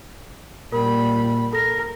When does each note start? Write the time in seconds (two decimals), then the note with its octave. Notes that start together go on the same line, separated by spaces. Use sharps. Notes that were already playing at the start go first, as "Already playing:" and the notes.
0.72 A#2 G3 A#4 B5
1.53 A4 A#4 A#6